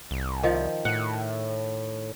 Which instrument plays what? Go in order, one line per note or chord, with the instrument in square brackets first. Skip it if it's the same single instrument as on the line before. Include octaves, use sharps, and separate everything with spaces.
[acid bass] C2
[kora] D#3 F3
[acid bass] A2 [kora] F#5